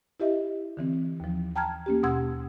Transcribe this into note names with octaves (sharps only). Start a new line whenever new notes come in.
E4 G4 D#5 E5
D3 E3 C4
D#2 F3
G5 A5 A#5 F6 G#6
A#3 C#4 G4
D#2 B2 F#5 C6 E6 G#6